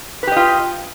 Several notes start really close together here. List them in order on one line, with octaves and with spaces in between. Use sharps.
B4 G4 D#5 F4